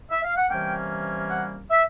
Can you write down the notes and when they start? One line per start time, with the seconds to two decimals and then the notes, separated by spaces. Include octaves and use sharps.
0.11 E5
0.24 F5
0.37 F#5
0.50 C3 E3 G3 A#3 C#4 G5
1.31 F#5
1.71 E5